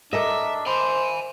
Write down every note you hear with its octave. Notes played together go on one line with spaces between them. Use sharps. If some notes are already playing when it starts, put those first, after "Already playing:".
D4 A4 A#4 D#5 E5
C5 G#5 B5